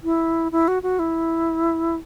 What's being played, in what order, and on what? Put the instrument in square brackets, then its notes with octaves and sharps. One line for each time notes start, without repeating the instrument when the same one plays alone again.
[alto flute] E4
E4
F#4
F#4
E4